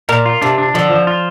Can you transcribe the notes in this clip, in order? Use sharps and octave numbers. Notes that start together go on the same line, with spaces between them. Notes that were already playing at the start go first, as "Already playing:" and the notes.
A#2 A#4
F4
C3 D4
D4
D3 F3
F3
F4